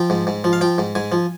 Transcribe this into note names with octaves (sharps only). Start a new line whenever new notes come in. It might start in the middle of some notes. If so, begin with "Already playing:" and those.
Already playing: F3 G5
G#2
G#2
F3
F5
F3 G5
G#2
G#2 G#5
F3